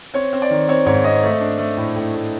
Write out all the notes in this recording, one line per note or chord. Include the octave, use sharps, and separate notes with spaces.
C4 C#5
C4
D5
D#3
C4 C#5
G#2 C#5
C4 D#5
A3
D4
A3
A2
A2
A3